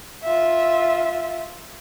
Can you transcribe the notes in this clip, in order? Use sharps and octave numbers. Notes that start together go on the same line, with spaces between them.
F4 E5